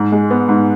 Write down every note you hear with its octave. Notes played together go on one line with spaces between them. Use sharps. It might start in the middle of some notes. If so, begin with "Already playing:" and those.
Already playing: G#2
G#3
B3
G#2